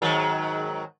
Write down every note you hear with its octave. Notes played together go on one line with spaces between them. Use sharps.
G#2 D#3 F#3